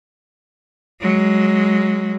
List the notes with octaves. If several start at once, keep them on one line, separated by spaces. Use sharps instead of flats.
F#3 G#3